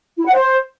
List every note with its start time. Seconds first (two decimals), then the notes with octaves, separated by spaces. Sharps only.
0.17 E4
0.25 F#5
0.33 C5